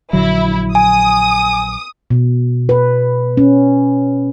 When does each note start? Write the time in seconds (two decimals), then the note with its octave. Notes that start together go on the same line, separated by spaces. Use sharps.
0.13 A#1 D3 F#3 E4
0.75 G#5 D#6
2.11 B2
2.69 B4
3.37 C#4